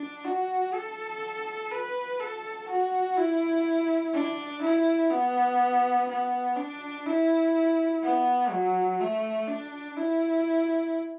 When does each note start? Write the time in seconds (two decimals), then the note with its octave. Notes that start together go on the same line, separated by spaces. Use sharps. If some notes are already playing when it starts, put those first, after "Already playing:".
Already playing: D4
0.24 F#4
0.73 A4
1.71 B4
2.20 A4
2.68 F#4
3.17 E4
4.13 D4
4.62 E4
5.11 B3
6.09 B3
6.56 D4
7.06 E4
8.03 B3
8.51 F#3
9.00 A3
9.48 D4
9.97 E4